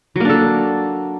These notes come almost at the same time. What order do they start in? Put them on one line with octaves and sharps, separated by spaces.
F#3 A#3 D4 A4